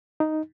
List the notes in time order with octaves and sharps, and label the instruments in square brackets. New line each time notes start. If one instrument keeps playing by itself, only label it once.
[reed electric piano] D#4